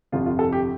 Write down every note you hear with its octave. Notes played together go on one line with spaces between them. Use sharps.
G1 F2 C3 F4
F4
A4
G4